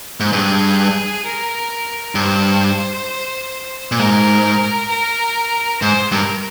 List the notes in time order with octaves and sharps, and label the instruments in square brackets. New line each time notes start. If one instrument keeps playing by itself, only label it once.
[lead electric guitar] G#2
[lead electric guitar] G2 [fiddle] G#4
[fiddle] A#4
[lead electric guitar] G2 [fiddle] C5
[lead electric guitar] A#2
[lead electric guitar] G#2 [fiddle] A#4
[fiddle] A#4
[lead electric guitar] G#2 [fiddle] C5
[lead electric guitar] G2 [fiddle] A#4